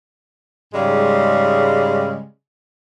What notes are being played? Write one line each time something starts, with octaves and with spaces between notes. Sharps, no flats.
G#2 C#3 G3 G#3